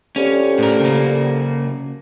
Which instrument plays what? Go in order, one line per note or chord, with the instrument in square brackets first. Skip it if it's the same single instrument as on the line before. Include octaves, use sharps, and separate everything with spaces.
[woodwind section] D3 F3 G3 [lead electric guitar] C#4
[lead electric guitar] A2 A#4
C#3 A#3